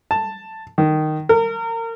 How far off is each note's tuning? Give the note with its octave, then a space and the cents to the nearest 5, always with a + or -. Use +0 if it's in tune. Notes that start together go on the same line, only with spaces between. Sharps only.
A5 +5
D#3 -10
A#4 -30